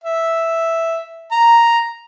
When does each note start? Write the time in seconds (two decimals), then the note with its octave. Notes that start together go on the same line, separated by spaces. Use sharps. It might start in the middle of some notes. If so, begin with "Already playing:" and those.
0.04 E5
1.32 A#5